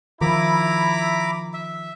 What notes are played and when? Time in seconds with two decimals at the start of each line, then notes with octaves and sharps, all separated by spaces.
0.21 D#3 F3 E4 A#5 B5 D6
1.53 E5